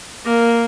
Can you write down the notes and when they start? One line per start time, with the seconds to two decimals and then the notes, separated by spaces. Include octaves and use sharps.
0.25 A#3